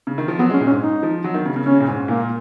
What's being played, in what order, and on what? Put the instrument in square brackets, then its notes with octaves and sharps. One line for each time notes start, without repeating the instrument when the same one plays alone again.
[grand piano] C#3
D#3
F3
[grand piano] F#3 [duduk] B3
[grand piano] G#3 [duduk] C#4
[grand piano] A#2
[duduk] C#4
[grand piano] G#2
[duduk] D#4
[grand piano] F3
F#3
D#3
C#3
C#3
[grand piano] C#3 [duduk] C#4
[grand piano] A#2
G#2
[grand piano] A#2 [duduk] A#3